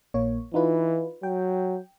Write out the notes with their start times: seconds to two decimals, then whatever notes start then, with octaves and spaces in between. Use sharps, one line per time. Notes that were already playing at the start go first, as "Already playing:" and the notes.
0.14 A#1 A#3 C#5
0.54 E3 D#4 F4 B4
1.23 F#3 G5